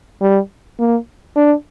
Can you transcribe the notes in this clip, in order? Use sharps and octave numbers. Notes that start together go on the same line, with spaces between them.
G3
A#3
D4